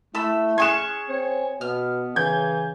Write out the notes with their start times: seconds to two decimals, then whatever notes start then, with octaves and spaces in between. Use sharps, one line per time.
0.15 A3 E4 A4 B5 E6
0.58 C#4 G#4 C#6 F#6 G#6 E7
1.09 C4 C#5
1.61 B2 B3 F6
2.16 C#3 E3 G6 G#6